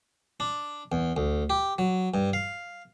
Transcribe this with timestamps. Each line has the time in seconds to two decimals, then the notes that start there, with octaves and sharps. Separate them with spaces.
0.40 D4
0.92 E2
1.17 D2
1.50 G4
1.78 F#3
2.14 G2
2.33 F5